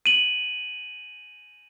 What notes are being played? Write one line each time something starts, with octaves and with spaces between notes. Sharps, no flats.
D#7 F#7